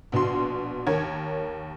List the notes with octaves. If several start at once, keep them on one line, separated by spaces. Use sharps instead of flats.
A#1 B2 F#4 C6
D#2 A#4 C#5 G#6